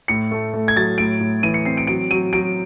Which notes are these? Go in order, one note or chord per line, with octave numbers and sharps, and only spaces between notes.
A2 C#7
A3
A3
G#6
F#3 A6
A2 D7
A2
E3 D#7
C#7
C4 C7
D7
F#3 D7
F#3 D#7
F#3 D7